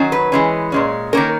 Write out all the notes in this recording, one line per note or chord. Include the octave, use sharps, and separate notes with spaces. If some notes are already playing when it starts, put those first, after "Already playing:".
Already playing: D#3 F#3 C#4
B4
E3 G#3 C#4
A#2 G#3 C#4
D#3 A#3 C#4 A#4